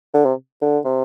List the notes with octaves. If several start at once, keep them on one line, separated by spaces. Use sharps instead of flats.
D3
C3
D3
C3